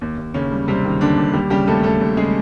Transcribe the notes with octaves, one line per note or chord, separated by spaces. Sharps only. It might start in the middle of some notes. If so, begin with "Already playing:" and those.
D#2
D#2
D#2 C#3 C#4
G3
C3 G3 C4
D#3
D#2 D3 D4
D#2
D#2 G3 G4
C#3 G3 G4
D#2 A3 A4
D#2 A3 A4
D#2
C#3 G#3 G#4